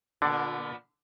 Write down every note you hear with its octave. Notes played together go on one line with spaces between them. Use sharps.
A#2 D3 B3 D5